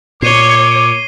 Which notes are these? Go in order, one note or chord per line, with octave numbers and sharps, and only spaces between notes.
A#2 C#5 D6 C7 D#7 G7